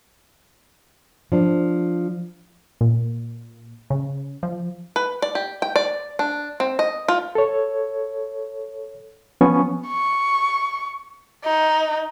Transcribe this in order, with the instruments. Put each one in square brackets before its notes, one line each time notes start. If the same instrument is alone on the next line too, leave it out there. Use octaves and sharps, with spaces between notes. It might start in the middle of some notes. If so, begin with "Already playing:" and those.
[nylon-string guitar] F3 D4
[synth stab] A#2
C#3
F3
[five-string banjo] B4
D5
G4
G5
D5
D4
C4
D#5
F4
[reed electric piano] A4 C#5
F3 B3 C#4 G#5 C#6
[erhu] C#6
D#4